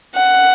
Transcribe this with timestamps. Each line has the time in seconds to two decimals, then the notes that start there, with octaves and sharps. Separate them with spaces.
0.15 F#5